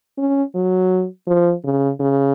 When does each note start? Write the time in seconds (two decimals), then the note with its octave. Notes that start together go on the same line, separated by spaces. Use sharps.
0.18 C#4
0.54 F#3
1.27 F3
1.64 C#3
2.00 C#3